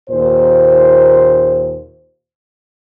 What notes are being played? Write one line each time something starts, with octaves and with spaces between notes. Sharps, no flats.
D#2 A#2 C5